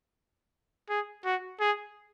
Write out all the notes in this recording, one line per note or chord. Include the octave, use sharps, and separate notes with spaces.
G#4
F#4
G#4